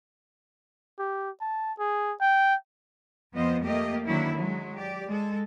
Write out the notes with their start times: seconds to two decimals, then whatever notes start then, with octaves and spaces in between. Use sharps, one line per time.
0.98 G4
1.41 A5
1.79 G#4
2.21 G5
3.34 F2 F3 B3 C5 D#5
3.64 A3 A#3 G4 D#5
4.06 D3 D#3 F#3 A#3 C#4 E4
4.36 F#3 G#3
4.74 G4 D5
5.09 G#3 A4